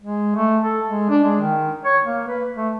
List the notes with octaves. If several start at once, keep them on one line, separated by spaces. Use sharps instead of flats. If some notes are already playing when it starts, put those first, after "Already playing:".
G#3
A3
A4
G#3
D4
G#3
D#3
C#5
A#3
B4
A3